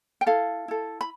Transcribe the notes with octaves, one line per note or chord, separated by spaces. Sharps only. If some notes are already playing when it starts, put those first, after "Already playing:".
G5
E4 A4 F5
E4 A4
B5